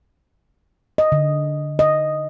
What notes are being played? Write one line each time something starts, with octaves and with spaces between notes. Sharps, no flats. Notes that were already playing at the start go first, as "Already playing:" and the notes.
D#5
D3
D#5